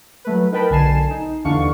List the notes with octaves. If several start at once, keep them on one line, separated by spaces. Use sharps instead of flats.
F#3 A3 B4
D#4 A#4 B4 G5 A5 B5
B1 D3 G#5 A5 C7 E7
D#4
D#2 D3 E3 D4 F5 C#6